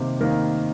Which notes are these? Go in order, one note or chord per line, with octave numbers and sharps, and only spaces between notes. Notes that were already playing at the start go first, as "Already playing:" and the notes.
Already playing: C3 D#3 A#3 G4
D#3 A#3 A#4